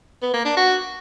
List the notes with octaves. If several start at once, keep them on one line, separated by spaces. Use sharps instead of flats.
B3
A#3
D4
F#4